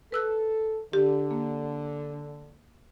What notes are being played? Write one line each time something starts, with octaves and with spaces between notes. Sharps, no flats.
A4 B4 E6 F#6
D3 G4
A#3